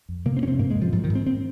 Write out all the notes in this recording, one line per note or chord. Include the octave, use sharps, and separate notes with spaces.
F2
C3 A#3
C4
F2 C#4
C4
G#2 A#3
G#3
G#2
F3
G#2 F3
D#3
G#2
C4
C4